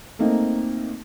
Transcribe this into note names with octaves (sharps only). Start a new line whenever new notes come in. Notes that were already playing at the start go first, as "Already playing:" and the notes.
A3 A#3 C4 D#4